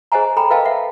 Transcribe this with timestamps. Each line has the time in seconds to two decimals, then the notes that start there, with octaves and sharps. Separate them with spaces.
0.12 G#4 C5 D#5 F#5 G#5 A#5
0.37 A4 G5 A#5 B5
0.50 A#4 B4 D#5 F5 G5 A5
0.65 E5 F#5